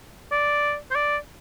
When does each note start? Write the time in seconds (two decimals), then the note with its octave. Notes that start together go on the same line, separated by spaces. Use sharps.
0.32 D5
0.91 C5
0.95 D5